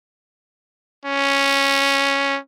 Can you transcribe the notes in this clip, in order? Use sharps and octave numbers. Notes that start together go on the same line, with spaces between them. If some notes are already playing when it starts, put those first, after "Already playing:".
C#4